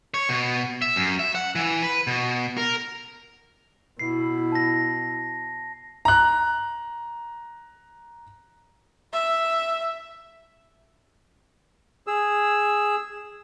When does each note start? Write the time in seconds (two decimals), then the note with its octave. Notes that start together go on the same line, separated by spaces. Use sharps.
0.14 C#5
0.29 B2
0.82 E5
0.96 F#2
1.19 E5
1.35 F#5
1.55 E3
1.83 B4
2.07 B2
2.58 A#4
3.99 B2 E4 C7
4.52 A5 A#6
6.05 A#5 F#6
9.13 E5
12.07 G#4 E6